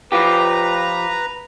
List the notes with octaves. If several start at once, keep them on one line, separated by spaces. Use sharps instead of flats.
F3 F4 G4 B4 A#5